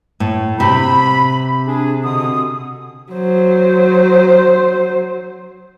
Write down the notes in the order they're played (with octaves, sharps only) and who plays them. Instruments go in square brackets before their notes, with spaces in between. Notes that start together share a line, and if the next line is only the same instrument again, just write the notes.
[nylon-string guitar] A2
[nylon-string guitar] C3 [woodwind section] B5
[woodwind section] D4 G#4
B2 D3 D#6
[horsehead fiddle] F#3 C5